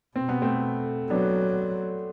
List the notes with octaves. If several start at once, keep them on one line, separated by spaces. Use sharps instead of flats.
B2 C4
B3
A3 C4
F#3 B3 D4